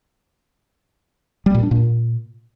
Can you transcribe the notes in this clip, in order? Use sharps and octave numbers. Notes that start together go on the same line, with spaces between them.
G3
A#2
D4
A#2